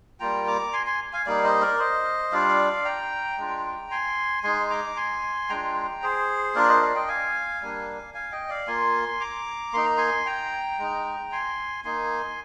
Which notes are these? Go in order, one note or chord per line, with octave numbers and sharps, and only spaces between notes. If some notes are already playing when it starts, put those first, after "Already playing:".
G3 A#3 F4 G5 A#5
A#5 D6
G#5 C6
G#5 C6
F5 G#5
G3 A#3 D#4 D5 F5
C5 D#5
A#4 D5
C5 D#5
G3 D4 F4 D5 F5
G5 A#5
G#3 D4 F4
G#5 C6
G#3 D#4 G#5 C6
A#5 D6
G#5 C6
G#3 D4 F4 G5 A#5
G#4 C5
A#3 D4 F4 A#4 D5
C5 D#5
D5 F5
D#5 G5
F5 G#5
G3 A#3 D4
F5 G#5
D#5 G5
D5 F5
A#3 F4 G#5 C6
A#5 D6
A#3 D#4 C6
A#5
G#5 C6
G5 A#5
G#3 D#4
G#5 C6
A#3 D#4 G#5 C6